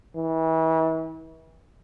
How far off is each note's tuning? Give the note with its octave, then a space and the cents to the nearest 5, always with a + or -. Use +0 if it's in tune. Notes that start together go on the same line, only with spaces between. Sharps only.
E3 -35